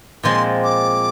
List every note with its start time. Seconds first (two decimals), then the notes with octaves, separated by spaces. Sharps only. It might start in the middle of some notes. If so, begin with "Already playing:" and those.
0.23 A#2 F3 G#3 C4 C6
0.64 D6